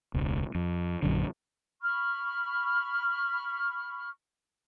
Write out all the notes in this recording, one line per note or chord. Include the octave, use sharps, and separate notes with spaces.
E1 C#2
F2
A#1 F#2 D3
B5 C#6 F6